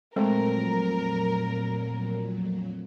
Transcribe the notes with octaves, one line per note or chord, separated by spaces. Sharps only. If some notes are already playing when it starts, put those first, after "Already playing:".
F2 A#2 F#3 G#3 A3 C4 A#4